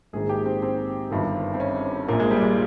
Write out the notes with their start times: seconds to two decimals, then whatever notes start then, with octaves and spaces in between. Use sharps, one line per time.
0.13 A#1 G#2 D#3 G#4
0.29 G4
0.46 C4
0.63 C4
1.11 G1 G2 D#3
1.54 C4
1.60 C#4
2.08 A#1 A#2 A#3
2.20 G#3
2.31 G3
2.43 G#3